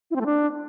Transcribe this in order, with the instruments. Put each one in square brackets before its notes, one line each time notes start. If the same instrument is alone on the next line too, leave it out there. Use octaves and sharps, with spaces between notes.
[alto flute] E4
C4
A3
D4